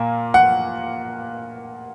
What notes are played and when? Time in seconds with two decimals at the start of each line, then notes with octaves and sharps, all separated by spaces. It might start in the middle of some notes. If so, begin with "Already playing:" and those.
Already playing: A#2 A#3
0.34 F#5